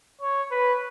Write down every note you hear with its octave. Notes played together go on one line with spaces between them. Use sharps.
C#5
B4